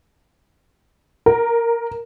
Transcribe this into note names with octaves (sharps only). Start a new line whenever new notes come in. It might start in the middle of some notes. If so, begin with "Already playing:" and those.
A#4